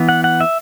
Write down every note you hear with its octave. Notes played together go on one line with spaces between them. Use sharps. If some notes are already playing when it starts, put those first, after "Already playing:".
Already playing: E3 B3
F#5
F#5
E5